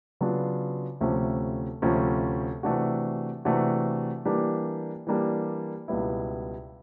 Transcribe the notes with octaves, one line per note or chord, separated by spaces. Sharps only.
C#3 F#3 B3 D4 F4
D2 C3 F3 A3 C#4
D2 C3 F3 A3 C#4
C3 E3 A3 D4 F#4
C3 E3 A3 D4 F#4
E3 G3 A#3 D4 G4
E3 G3 A#3 D4 G4
C#2 B2 G3 B3 E4